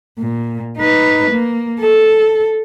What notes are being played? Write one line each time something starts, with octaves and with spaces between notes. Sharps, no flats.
A#2
D#4 B4
A#3
A4